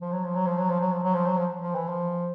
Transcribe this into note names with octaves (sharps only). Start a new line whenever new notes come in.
F3
F#3
F3
F#3
F3
F#3
F3
F#3
F3
F#3
F3
F#3
F3
F3
E3
F3